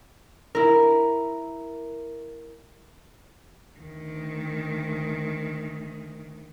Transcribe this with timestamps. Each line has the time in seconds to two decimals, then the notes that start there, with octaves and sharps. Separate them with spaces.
0.55 E4 A#4
3.79 D2 D#3